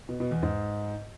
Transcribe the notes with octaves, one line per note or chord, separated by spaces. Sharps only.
B2
B2
E2
G#2